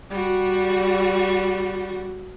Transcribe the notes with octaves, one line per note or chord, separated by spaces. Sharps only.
G3 F#4